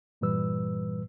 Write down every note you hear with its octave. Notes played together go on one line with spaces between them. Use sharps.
G2 A#2 E3 G3 B4 E6